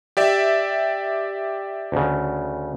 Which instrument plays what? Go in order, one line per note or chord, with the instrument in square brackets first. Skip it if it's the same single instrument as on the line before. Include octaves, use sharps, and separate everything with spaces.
[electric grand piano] G4 D5 E5
[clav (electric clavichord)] D2 C#3